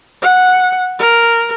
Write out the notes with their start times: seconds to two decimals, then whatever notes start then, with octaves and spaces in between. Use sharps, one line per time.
0.22 F#5
0.99 A#4